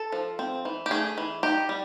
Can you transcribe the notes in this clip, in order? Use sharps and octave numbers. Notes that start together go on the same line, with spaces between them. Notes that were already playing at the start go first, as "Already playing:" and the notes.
Already playing: A4
F3
C4
E3
G4
A3 G#4
E3
D#4 G4
G3